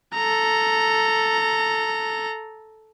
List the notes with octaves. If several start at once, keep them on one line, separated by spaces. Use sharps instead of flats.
A4 A#5